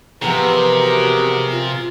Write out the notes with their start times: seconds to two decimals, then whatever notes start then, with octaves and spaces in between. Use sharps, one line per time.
0.22 C3 E3 F3 B3 G4 G#4 A#4 A#5
0.82 F#4
1.50 F4